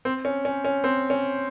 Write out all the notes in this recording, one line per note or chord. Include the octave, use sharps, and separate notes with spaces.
C4
C#4
C#4
C#4
C4
C#4